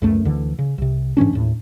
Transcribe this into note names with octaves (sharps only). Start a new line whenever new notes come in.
C#2 F#2 A3
D2 D3 E3
C#3
C2 C3
G#2 E3 C#4 D4
D#2 A2